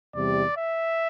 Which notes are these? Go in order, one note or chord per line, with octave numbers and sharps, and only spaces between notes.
E2 C3 G3 D5
E5